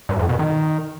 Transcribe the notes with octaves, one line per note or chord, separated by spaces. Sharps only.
G2
F2
B2
D#3